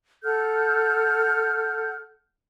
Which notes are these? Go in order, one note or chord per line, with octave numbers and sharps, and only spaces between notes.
A4 F#5 F6 G6